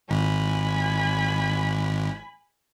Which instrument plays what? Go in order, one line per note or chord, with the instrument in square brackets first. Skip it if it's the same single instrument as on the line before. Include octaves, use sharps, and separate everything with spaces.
[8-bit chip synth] G#1 [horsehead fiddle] G#5 B5